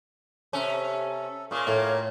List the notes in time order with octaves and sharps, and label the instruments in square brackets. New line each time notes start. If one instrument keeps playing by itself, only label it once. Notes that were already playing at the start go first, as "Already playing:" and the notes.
[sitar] C3 C#4 [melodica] A4
[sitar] A#2 A#3 [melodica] C#4 G#4 F5
[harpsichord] A2 [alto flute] C#5 [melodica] F5